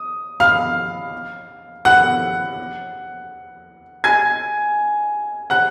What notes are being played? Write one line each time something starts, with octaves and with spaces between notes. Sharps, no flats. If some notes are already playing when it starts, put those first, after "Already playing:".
Already playing: D#6
F5 F6
F#5 F#6
G#5 G#6
F#5 F#6